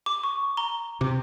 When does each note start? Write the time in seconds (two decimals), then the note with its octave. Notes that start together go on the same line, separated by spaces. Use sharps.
0.06 D6
0.24 C#6
0.57 A#5 G7
1.01 C3 D6